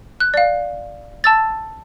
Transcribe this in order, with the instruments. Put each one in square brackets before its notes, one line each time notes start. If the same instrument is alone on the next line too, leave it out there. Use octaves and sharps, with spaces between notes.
[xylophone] F#6
D5 F5
A5 E6 A6